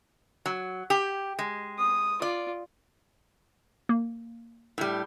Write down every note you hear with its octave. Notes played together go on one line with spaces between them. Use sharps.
F#3
G4
G#3
D#6
F4 D5
A#3
A2 G3